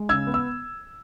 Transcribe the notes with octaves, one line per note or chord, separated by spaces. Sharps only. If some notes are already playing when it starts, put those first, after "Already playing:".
Already playing: G#3
C#3 E6 G#6
B3
E6